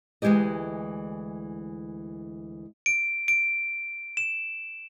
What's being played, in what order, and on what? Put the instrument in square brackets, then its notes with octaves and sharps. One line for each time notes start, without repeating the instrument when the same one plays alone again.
[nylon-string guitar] D2 E3 G#3 E4 G4 D#5
[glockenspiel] D7
D7
E7